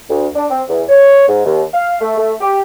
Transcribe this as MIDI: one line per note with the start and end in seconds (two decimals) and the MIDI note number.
0.10 0.27 38
0.35 0.45 62
0.50 0.62 60
0.68 0.82 40
0.89 1.27 73
1.27 1.42 44
1.46 1.62 39
1.73 1.95 77
2.00 2.15 57
2.18 2.33 57
2.40 2.61 67